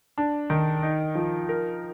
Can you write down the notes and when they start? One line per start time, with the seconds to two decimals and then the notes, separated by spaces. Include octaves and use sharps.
0.18 D4
0.50 D#3
0.83 D#4
1.15 F3
1.49 A#4